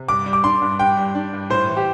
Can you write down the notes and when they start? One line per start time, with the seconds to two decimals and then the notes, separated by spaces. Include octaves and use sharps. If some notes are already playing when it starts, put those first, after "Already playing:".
Already playing: C3
0.08 G2 D6
0.26 G3
0.33 D6
0.44 D4 C6
0.62 G2
0.79 G2 G5
0.97 G3
1.15 D4
1.33 G2
1.50 A2 C5
1.68 E3
1.77 G4